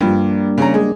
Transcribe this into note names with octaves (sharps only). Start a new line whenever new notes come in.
G2 F3 G3 A#3 D4
C#3 C#4 A#5
G#3